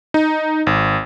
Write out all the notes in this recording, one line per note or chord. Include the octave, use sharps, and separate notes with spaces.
D#4
G#1